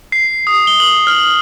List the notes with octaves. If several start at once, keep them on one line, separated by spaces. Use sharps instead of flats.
C7
D#6
G7
F#7
F6